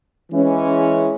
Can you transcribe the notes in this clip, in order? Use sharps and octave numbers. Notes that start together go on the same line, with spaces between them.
E3 G#3 C#4